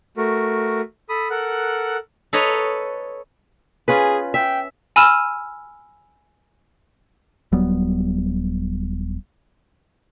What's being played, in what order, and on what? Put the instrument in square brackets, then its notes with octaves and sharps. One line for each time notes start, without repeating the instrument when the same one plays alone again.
[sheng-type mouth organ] A3 F#4 A#4
A4 B5 D#6
A4 A#4 F#5 F#6
[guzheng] A4 B4 C#5 D#5 A#5 B5
[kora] C#4 F4 B4 [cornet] G#4
[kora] E5 [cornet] G5
[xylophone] G#5 B5 E6 F6 D#7 E7
[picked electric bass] D#1 F#3 G3 B3